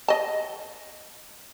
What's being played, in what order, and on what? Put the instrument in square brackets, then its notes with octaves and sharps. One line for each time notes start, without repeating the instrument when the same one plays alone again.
[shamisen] D#5 A5